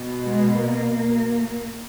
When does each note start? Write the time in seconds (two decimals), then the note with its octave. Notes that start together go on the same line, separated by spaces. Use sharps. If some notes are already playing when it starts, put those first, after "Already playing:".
Already playing: B2
0.24 G#3
0.60 A#3